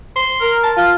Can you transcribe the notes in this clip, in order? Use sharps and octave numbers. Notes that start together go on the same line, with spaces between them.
C6
A#4
A5
F4